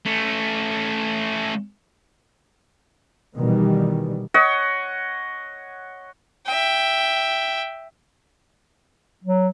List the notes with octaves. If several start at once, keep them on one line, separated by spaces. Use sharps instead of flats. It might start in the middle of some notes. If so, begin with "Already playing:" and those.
A3 C#4
B2 D#3 E3 G3
C#5 D#5 F#5
E5 G5
F#3